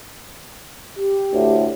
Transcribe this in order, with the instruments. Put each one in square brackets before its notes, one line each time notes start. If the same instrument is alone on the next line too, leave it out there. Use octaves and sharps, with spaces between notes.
[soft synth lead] G4
[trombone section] D2 A2